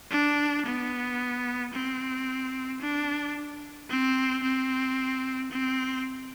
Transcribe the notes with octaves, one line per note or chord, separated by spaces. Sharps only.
D4
B3
C4
D4
C4
C4
C4